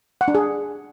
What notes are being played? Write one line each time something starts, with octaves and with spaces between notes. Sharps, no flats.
F#5
D4
G#4